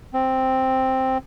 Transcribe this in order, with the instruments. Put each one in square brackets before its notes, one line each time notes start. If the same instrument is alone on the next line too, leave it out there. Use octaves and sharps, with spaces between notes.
[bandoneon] C4